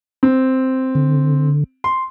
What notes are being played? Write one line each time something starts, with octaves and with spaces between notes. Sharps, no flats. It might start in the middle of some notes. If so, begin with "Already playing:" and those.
C4
D3
C6